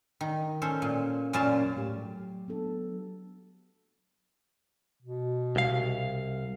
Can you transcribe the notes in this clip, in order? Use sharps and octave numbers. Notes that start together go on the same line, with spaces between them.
D#3
C#4 A4 C5
A#2
F#2 A#2 C#4 D5 F5 A5
A2 A3 G4
F#3
B3 D4 A4
B2
C2 F5